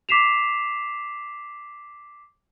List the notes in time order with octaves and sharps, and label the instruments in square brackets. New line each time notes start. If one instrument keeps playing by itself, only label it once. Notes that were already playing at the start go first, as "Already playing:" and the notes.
[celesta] D6 B6 C7 E7 F7